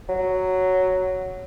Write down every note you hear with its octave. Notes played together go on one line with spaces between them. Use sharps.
F#3